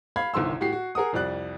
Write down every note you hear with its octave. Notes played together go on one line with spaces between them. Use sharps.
F5 B5 G#6
G1 C2 D#3 C6 E6
A2 F#4 G4 C7
F#4
G#4 A#4 F#5 D#6
C2 F2 G3 D5 F#6